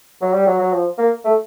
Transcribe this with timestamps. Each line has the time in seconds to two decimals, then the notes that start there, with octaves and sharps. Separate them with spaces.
0.22 F#3
0.33 G3
0.47 F#3
0.59 F#3
0.73 F3
0.98 A#3
1.25 A3